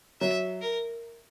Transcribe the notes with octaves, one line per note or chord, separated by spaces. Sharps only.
F#3 E5
A#4